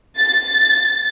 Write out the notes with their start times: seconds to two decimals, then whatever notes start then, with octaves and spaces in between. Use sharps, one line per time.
0.18 A6